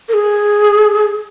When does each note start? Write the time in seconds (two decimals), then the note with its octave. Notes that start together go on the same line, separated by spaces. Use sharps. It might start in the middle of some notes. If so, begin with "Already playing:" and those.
0.09 A#4
0.14 G#4